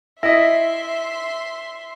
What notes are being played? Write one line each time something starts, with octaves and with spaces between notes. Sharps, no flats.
E4 D#5 E5 C6 A#6 B6